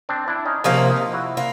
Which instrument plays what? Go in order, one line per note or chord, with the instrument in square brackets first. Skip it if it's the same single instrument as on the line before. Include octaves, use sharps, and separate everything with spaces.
[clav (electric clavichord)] C4 D4
D4 E4
C#4 D#4
[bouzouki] C3 F3 A#3 [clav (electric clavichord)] C#4 D#4
[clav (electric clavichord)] D#4 F4
E4 F#4
[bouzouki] A#3 [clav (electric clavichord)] F4